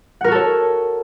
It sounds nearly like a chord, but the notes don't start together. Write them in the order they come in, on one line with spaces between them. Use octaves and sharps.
F#5 A#4 F#4 A4 C#5